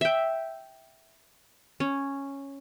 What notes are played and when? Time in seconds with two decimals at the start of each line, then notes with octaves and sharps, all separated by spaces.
0.01 E5 G5
1.80 C#4